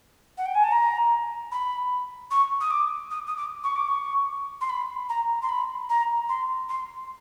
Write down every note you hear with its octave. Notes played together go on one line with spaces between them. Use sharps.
F#5
G5
G#5
A5
A#5
B5
C#6
D#6
D6
D#6
D#6
D6
C#6
D6
C#6
C6
B5
A#5
C6
B5
A#5
C6
C6